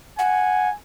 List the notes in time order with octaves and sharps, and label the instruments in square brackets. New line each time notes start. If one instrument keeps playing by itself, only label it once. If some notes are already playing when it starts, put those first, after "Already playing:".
[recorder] F#5 [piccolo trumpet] G#5